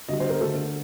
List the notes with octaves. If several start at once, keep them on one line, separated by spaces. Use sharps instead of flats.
D3 G3 D#5
C5
A#4
D3 A3 A4